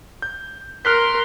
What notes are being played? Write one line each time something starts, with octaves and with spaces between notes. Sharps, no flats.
G6
A#4 C6 F6 F#6 B6